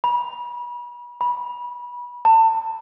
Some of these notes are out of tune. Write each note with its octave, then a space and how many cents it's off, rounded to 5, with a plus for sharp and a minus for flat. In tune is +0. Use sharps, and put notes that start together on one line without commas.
B5 -35
B5 -25
A5 +30